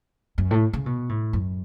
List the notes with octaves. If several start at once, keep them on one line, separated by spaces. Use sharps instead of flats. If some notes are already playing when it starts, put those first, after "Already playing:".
F#2
A2
C#3
B2
A2
F#2